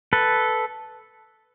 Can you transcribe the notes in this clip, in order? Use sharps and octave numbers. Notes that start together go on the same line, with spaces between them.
A4 B4